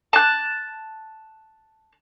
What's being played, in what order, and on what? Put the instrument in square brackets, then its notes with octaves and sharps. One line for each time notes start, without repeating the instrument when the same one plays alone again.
[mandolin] A5 F#6